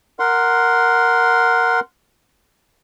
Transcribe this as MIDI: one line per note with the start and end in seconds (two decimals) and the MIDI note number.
0.19 1.80 70
0.19 1.80 78
0.19 1.80 84